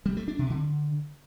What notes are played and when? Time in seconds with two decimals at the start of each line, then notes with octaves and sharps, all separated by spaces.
0.06 G3
0.17 A3
0.28 D4
0.39 C3
0.50 D3